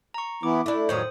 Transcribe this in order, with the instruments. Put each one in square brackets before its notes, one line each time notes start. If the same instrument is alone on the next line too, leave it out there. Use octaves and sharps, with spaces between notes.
[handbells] A#5 C#6
[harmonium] E3 B3 E4 [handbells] D6
[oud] A3 D4 [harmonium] E4
[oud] F2 A2 D#3 [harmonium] F#3 C#5 [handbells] C5 D#6